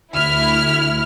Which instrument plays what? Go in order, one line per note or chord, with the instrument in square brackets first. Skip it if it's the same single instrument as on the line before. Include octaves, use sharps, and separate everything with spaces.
[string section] D2 E4 F6